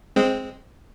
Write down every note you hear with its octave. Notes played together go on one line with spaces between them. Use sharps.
G#3 C4